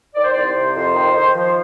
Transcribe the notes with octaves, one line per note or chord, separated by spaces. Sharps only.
D#3 D5
C5
C2 D5
C5
C3
F2
D#3
D#3
F3